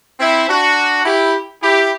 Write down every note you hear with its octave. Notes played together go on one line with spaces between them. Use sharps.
C4 E4
D4 F#4
E4 G4
E4 G4